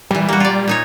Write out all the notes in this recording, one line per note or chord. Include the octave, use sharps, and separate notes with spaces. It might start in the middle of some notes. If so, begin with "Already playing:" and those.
A#2 E3 G3
A#3 F#4
F4 D5
A#2 D#4 C#5